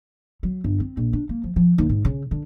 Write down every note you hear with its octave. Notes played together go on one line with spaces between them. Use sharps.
F#3
G1
C4
A#1
D4
A#3
F3
F3
D#2
G#2
C#3
D3